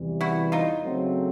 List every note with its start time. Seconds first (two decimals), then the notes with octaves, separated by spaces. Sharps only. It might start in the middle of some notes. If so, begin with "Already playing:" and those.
Already playing: E2 C3 E3 G3
0.21 E4 F#4
0.52 D#4 F4
0.83 C#3 F#3 A3 C4